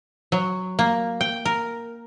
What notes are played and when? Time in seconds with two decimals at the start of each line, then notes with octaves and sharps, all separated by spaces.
0.32 F#3
0.79 A#3
1.21 G5
1.45 A#4